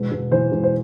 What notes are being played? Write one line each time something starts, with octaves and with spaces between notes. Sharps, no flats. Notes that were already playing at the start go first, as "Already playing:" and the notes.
Already playing: E1
E1
E3 C5
E1
C5